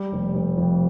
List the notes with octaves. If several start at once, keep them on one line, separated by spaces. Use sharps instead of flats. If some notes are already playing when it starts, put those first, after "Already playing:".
Already playing: G3
F1
F1
F2